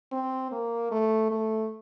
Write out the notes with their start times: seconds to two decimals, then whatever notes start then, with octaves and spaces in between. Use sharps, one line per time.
0.12 C4
0.52 A#3
0.91 A3
1.31 A3